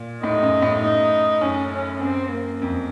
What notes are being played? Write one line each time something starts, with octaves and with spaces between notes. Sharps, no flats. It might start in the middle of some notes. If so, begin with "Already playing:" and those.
Already playing: A#2
A2 D#4
F#2
A2
D#4
F#2 C#4
C#4
F#2 C4
A#3
F2